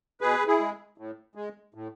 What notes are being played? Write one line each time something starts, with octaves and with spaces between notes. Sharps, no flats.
B2 G#4 B4
E4 G#4
G#3
A2
G#3
A2